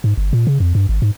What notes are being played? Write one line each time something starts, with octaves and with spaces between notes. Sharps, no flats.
G#2
G1
A#2
C#3
F2
G2
G#1
G#2